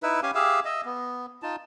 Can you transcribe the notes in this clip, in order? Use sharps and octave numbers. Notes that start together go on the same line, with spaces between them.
D#4 E4 B4 E5
C#4 G4 F5 G#5
G4 G#4 E5 F5
D#5 E5
B3
D#4 F4 A5